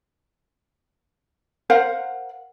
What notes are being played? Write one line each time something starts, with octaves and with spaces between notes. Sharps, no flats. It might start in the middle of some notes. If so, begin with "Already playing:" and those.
A#4 C5 F5 F#5